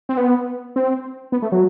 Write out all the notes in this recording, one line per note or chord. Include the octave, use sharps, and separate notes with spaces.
C4
B3
C4
B3
A3
F#3